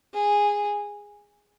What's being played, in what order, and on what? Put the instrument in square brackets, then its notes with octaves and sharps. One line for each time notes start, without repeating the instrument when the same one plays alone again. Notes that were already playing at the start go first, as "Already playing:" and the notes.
[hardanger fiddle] G#4